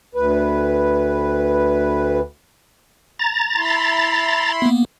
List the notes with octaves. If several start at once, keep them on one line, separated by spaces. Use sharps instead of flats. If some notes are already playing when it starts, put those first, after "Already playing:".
D2 B4
A#5 A6
E4 B5 C6
A#3 B3